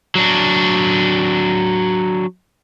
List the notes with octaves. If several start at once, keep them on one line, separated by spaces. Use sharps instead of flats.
F#3 D4